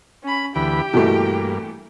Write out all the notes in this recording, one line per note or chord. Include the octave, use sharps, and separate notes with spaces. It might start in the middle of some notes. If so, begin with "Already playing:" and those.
C#4 B5
D2 E3 G4 G5 B5
G2 B2 E3 A3 A#3